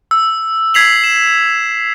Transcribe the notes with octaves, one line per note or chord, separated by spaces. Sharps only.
E6
G#6 B6 C7 F7 F#7
E7